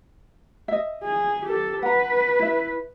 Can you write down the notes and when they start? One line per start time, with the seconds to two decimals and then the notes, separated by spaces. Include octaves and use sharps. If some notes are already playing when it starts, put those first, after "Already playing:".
0.68 D#5 E5
1.04 G#4
1.45 G4 A4
1.83 B4 F#5 A#5
2.39 E4 E5